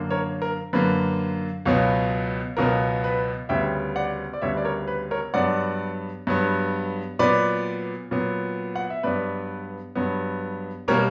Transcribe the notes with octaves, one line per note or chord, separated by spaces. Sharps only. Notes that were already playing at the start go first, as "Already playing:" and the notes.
Already playing: F#2 D3 A#3
A#4 C#5
A#4
F#2 D3 A#3 B4
C#2 B2 F#3 B3
C#2 B2 F#3 B3 A#4
B4
D2 C#3 G3 B3 E5 G5
D5 F#5
D5
D2 C#3 G3 B3 C#5 E5
D5
A#4 C#5
B4
A#4 C#5
G2 F#3 B3 D5 F#5
G2 F#3 B3
A#2 F#3 B3 B4 D5
A#2 F#3 B3
F#5
E5
G2 F#3 B3 B4 D5
G2 F#3 B3
B2 G3 A#3 A#4 C#5